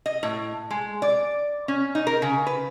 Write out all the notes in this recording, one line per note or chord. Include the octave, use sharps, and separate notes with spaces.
D#5
A2
G#3
D5
C#4
D#4
A#4
C#3
B4